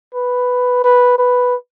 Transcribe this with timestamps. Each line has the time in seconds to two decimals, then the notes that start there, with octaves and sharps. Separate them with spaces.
0.14 B4
0.84 B4
1.18 B4